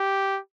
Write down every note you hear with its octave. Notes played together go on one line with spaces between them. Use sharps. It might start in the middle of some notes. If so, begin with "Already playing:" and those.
Already playing: G4